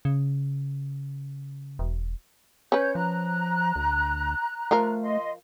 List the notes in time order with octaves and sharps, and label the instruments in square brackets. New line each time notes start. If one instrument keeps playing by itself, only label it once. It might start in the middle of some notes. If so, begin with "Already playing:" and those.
[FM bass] C#3
E1
[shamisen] C#4 B4 [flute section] C#5 G6
[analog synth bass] F3 [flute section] A#5 F#6
[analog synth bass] D2
[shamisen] F3 F4 A#4 [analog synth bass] A3
[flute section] D#5 C6